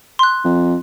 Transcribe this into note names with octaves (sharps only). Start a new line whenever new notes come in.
C6 F#6
F2